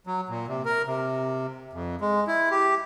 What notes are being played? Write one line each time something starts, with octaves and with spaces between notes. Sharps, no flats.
F#3
A#2
C3
A#4
C3
F2
G#3
E4
G4